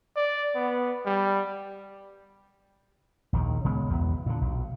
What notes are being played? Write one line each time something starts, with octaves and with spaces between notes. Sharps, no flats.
D5
B3
G3
A#1 D#2 D#3
C#3 G#3 B3
B1 E2 B3
A#2 D3
B1